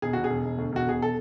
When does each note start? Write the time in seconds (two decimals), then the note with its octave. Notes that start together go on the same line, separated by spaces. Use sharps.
0.02 E1 G#4
0.13 E1 F#4
0.24 G#4
0.30 E1
0.45 E1
0.58 D2
0.72 E1 F#4
0.86 E1 G#4
1.02 A4